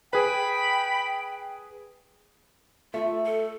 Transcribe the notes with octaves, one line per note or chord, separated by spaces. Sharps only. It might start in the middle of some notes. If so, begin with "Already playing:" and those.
G#4 B4 G5 B5
A3 F4 E5
A4